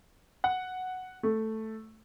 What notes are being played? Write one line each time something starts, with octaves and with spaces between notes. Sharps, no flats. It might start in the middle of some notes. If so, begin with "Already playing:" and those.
F#5
A3